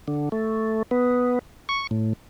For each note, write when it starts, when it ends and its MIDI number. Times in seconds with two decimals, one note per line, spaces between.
0.08 0.29 50
0.32 0.83 57
0.91 1.39 59
1.69 1.87 85
1.91 2.13 45